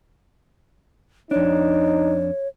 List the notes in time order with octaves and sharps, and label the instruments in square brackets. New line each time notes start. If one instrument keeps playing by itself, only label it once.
[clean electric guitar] F2 D4 [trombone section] D#4 [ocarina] C#5